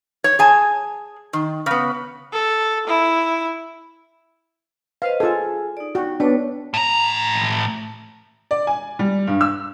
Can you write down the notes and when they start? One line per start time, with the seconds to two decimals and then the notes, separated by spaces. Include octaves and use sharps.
0.24 C#5
0.39 G#4 G#5 A5
1.33 D#3
1.66 C#3 B3
2.33 A4
2.87 E4
5.02 B4 C5 D#5 F5
5.20 F4 G#4 A4 G#5
5.77 D#4 D5
5.95 D#4 F#4 G5
6.20 B3 D4 B4 C#5
6.74 A2 A#5
8.51 D5
8.67 G#5
8.99 G3
9.27 G2
9.41 E6